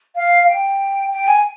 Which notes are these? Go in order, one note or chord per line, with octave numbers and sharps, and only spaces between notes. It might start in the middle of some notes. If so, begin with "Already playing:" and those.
F5
G5
G5
G#5